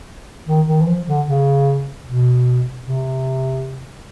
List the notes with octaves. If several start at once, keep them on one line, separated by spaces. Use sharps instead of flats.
D#3
D#3
E3
F3
D3
C#3
B2
C3